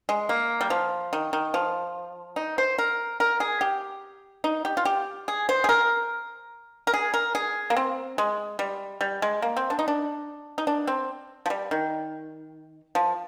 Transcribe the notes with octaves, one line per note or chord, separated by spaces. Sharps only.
G#3
A#3
G3
F3
D#3
D#3
F3
D#4
C5
A#4
A#4
G#4
G4
D#4
G4
F4
G4
G#4
C5
G#4
A#4
A#4
G#4
A#4
G#4
A#3
C4
G#3
G3
G3
G#3
A#3
C4
D4
D#4
D4
D#4
D4
C4
F3
G3
D#3
F3